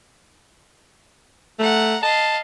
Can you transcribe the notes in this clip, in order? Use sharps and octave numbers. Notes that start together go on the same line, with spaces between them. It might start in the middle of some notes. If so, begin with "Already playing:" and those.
A3 F#5 A#5
D#5 F5 A5